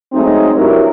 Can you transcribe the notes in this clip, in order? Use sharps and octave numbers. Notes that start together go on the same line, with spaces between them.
F#3 G#3 A3 C4 D#4
G2 F#3 E4 G4 A#4 C5